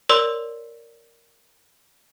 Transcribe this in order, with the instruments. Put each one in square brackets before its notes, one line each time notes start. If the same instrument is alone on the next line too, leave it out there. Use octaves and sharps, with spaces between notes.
[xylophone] A#4 C#5 D5 C6 E6 F#7